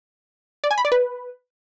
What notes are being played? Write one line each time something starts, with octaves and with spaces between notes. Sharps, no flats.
D5
G#5
B5
D5
B4